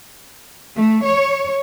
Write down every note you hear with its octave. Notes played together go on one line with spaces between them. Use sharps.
A3
C#5